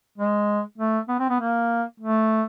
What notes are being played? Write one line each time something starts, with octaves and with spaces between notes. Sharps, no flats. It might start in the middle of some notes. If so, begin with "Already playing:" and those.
G#3
A3
B3
C4
B3
A#3
A3